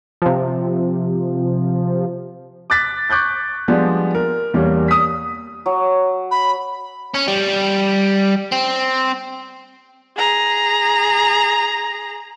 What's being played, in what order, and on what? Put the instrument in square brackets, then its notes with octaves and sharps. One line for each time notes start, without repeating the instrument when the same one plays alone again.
[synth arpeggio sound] C3 F3
[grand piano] D6 F#6 A6 B6
C#6 D6 F#6 G6 A6
F3 G3 G#3 B3 D4
A#4
E2 G3 A#3 D4 C#5
D#6 B6
[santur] F#3
[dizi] B5
[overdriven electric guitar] C#4
G3
C4
[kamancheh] G#4 A#5